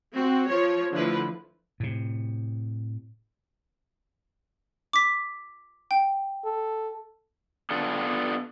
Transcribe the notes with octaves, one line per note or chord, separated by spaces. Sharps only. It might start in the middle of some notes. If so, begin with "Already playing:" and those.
C4 F#4
F3 C#5
D3 F3 A3 E4 B4
A2 C3
D6 B6
G5
A4
B3 D4 F4 A4